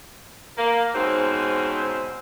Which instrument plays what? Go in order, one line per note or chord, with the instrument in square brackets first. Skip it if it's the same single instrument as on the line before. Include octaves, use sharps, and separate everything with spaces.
[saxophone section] A#3
G#2 B2 C4 C#4 D#4 C5